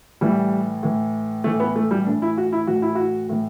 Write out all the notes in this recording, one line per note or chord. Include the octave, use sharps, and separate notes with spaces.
A2 E3 G3
A2 E3
A2 E3 A3
B3
A3
G3
A2 E3 D4
E4
F#4
E4
A2 E3 F#4
E4
F#4
A2 E3